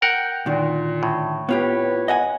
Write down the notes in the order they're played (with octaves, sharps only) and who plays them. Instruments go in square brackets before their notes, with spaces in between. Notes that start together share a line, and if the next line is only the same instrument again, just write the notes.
[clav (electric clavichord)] A#4 F#5 [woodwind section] G5
[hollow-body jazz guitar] D2 D#3 [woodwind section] A#2
[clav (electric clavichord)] A2
[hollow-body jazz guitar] B3 F4 G4 [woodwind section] E4 B4 C#5
[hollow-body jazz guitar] D#5 F#5 G#5